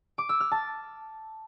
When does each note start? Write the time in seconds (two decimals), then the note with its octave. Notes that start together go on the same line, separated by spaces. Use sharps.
0.18 D6
0.29 E6
0.40 F6
0.52 A5